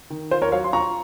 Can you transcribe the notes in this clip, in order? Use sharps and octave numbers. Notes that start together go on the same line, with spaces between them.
D#3
F4 C5
A#4 C#5
F#3 C#5 F5
C6
F4 A#5 C#6